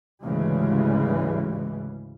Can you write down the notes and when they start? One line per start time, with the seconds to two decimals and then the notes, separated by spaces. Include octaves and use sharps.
0.24 D2 G#2 C#3 E3 G3 G#3